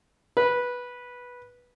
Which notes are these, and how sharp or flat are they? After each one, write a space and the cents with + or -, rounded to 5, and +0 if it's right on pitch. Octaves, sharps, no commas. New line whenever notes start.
B4 -10